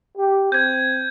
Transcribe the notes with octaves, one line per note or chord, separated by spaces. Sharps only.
G4
C4 G6 G#6